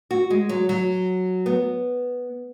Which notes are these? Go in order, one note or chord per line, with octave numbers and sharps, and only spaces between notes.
F#4
G#3
F#3
F#3
B3